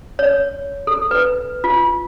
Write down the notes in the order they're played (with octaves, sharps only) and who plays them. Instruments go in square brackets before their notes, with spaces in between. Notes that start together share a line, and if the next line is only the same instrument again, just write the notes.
[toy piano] C#5
A4
B4
F4